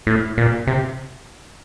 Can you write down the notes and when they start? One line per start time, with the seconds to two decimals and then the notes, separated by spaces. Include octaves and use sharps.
0.07 A2
0.38 A#2
0.67 C3